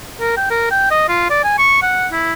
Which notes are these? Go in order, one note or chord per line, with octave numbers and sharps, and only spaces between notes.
A#4
G5
A#4
G5
D#5
F4
D5
G#5
C#6
F#5
E4